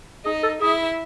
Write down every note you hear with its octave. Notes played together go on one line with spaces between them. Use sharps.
D#4 G#4 D#5
A4
E4 G#4 E5